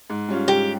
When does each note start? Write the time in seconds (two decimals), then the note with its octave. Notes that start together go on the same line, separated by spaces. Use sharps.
0.10 G#2
0.29 G3 C#4 F4
0.48 G#2 G4